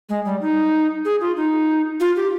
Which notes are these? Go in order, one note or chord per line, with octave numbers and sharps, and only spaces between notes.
G#3
G3
D#4
G#4
F4
D#4
F4
G4